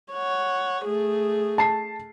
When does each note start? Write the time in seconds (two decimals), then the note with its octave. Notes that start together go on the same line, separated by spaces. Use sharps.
0.13 C#5 F#5
0.85 A3 G#4
1.58 A5 C7